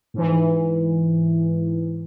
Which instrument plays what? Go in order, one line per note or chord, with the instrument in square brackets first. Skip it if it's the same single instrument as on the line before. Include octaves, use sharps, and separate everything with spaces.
[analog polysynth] G#2 E3